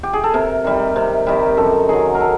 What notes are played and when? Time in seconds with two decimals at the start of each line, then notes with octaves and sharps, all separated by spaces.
0.03 G4
0.13 G#4
0.24 A4
0.34 C3 A#4
0.64 D#3 G3
0.96 C3
1.27 D#3 G3
1.57 F#2 A4
1.89 D#3 F#3 G#4
2.15 A#4
2.20 A4